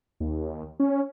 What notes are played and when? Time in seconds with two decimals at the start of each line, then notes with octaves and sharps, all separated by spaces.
0.20 D#2
0.80 C#4